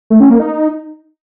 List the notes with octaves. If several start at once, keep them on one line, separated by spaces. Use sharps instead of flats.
A3
C#4
A#3
D#4